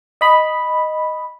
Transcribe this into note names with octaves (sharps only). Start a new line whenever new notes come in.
D#5 B5